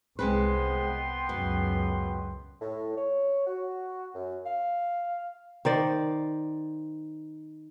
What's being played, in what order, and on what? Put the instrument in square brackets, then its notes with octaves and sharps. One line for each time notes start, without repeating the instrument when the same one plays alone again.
[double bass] C2 [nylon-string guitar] G#3 C4 B4 [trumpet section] B3 G5 C6
[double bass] C#2 F#2 [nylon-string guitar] B2
[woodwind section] A2
C#5
F#4
F#2
F5
[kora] D#3 C5 D5